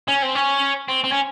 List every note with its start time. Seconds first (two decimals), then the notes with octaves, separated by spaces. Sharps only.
0.08 C#4
0.22 C4
0.35 C#4
0.88 C4
1.04 C4
1.12 C#4